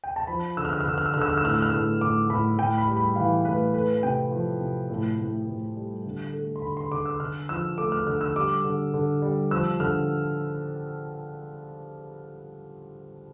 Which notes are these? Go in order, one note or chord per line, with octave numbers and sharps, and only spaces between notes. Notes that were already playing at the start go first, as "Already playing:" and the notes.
G5
A5
F3 B5
D3 E6
F6
E6
F6
D3 E6
F6
E6
D3 F6
E6
F6
E6
A2 F6
E6
F6
A2 E6
A2 D6
A2 B5
A2 G5
B5
G3
B5
E3 F5
A2 B4
A3 B4
C3 G5
F3
C3
A2
A2
A2
G3
D3
A3
C6
D3 B5
C6
D3 D6
E6
D3 F6
F3 E6
A3 D6
F6
D3 F6
E6
G3 D6
D3
D3
G3
F3 E6
D3 F6